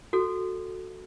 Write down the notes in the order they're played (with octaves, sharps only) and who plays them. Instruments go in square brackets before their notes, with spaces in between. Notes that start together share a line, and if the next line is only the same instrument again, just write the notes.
[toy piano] F#4 A4